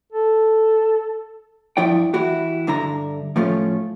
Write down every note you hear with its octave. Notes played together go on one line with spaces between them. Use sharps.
A4
G2 F3 E4 D5 G5
E3 E4 F#4 G4
G2 D3 E5 A#5
A2 F3 A3 C#4 F4